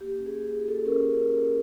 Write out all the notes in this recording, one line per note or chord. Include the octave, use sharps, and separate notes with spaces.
A#3 G4
C#4
G#4
A#3
F4
A#3 A4
C#4 A#4